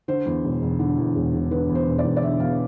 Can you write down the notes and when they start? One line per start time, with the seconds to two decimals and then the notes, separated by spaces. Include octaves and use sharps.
0.08 D3 C5
0.26 E2
0.44 E1
0.62 E1
0.79 D3
0.97 E2
1.15 E1
1.33 E1
1.51 D3 B4
1.69 E2
1.75 C5
1.86 E1
1.98 D5
2.04 E1
2.16 D5
2.22 D3 E5
2.40 E2 F5